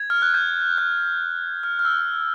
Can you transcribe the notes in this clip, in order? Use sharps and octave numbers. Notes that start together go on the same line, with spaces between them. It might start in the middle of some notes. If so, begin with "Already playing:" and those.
Already playing: G#6
F6
F#6
G6
F#6
F6
F6
E6